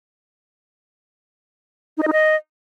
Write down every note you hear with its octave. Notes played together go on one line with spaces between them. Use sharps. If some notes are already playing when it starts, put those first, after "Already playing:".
D#4
D#5
D#4
D#5